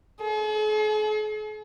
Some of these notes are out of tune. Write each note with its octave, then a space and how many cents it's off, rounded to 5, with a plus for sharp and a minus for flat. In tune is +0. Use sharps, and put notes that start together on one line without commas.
G#4 +45